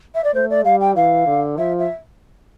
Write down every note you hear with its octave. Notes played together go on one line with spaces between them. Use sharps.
E5
D5
A3 C5
D5
G3 F5
G5
E3 F5
D3
F3 E5
E5